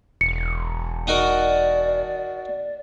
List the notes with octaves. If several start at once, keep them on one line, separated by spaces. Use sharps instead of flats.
E1 C#7
D#4 F#4 A#4 D5